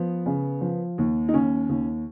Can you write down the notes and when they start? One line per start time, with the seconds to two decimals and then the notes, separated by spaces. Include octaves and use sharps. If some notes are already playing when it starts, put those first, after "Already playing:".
Already playing: F3 B3
0.26 C#3
0.61 F3
0.98 D#2
1.29 D#4
1.34 D#2 C#4
1.69 D#2